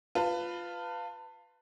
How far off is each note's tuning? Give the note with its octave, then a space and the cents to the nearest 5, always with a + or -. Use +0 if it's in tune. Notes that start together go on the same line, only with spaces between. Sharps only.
F4 +0 B4 +15 A5 +25